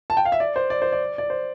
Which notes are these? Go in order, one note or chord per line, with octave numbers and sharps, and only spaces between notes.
A5
G5
F5
E5
D5
C5
D5
C5
D5
D5
C5